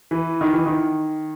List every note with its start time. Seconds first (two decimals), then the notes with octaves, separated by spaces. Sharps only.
0.11 E3
0.41 D#3
0.53 E3
0.66 D#3